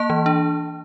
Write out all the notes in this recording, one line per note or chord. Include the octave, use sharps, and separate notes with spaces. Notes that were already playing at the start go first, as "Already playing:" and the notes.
Already playing: A#3 A5
E3
D4